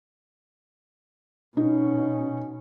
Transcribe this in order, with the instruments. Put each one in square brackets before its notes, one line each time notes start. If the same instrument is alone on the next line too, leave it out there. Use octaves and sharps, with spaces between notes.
[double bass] B2 C#4 [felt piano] D#4